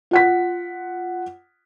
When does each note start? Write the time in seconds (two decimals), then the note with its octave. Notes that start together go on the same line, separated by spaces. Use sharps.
0.11 F4 F#5 B6